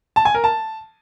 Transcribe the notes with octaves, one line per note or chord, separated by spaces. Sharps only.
A5
G#5
A#4
A5